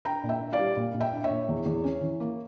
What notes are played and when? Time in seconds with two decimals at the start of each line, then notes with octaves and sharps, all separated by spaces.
0.05 D4 G5 A#5
0.24 A#2
0.29 E5 G5
0.41 D4
0.53 D5 F5
0.59 G3
0.77 A#2
0.94 A#2
1.00 E5 G5
1.13 D4
1.24 C#5 E5
1.30 A#2
1.49 E2
1.66 E2
1.84 C#4
2.01 E3
2.20 A#3